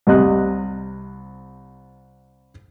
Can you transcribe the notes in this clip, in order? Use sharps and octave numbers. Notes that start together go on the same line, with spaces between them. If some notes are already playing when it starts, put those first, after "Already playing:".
C2 C3 D#5 F#6